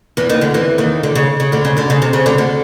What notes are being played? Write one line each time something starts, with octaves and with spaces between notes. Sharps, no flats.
E2 E3
D#2 D#3
D2 D3
E2 E3
D#2 D#3
D2 D3
C#3
C#3
D2 D3
C#3
D2 D3
C#3
C3
C#3
D2 D3
D2 D3